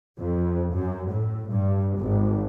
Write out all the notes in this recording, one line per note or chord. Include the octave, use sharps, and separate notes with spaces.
F2
F#2
A2
G2
G#1